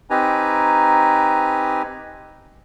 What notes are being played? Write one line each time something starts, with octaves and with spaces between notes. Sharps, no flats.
C4 D#4 G4 B4 G#5 A#5